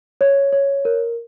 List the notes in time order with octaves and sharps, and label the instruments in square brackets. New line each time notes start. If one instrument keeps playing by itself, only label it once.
[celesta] C#5
C#5
A#4